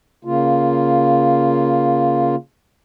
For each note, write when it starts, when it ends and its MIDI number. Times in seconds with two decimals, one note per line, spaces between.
0.25 2.35 49
0.25 2.35 58
0.25 2.35 65